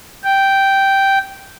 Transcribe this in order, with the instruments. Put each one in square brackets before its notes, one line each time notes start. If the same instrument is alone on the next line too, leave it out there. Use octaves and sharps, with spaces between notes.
[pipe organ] G5